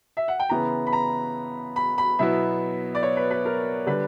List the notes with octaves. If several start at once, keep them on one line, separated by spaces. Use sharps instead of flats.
E5
F#5
G5
C#3 E3 B3 E4 A#5
B5
A#5
B5
B5
B2 F#3 B3 E4 E5
D5
C#5
B4
B4
A#4
D3 G3 B4